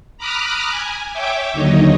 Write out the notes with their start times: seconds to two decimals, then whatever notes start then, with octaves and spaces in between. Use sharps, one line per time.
0.18 A#5 B5 D6 D#6 F6 F#6
0.71 G#5
1.12 C#5 E5 G5 D6
1.53 D#2 D3 F#3 D#4 C#5 D#5